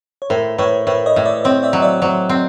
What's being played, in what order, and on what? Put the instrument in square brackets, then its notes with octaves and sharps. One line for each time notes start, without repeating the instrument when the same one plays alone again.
[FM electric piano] C#5
[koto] A2 [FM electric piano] A#4 C5
[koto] A2 [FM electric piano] B4 C#5
[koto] A2 [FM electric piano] B4 C#5
[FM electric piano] C#5 D#5
[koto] A2
[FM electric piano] D5 E5
[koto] C4 [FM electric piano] C#5 D#5
[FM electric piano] D5 E5
[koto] F#3
[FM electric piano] D5 E5
[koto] F#3 [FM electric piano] C5 D5
[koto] C4